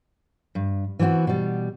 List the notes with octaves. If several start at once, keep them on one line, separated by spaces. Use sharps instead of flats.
G2
E3 B3 C4 F4 F#4
B2 G3